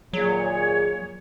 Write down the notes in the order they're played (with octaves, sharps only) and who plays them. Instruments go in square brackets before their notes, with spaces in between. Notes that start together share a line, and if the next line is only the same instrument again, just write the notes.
[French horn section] D#2 A#2 G#4 [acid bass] F#3 [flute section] C#5